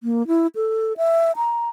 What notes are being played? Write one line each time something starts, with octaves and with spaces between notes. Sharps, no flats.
A#3
E4
A4
E5
A#5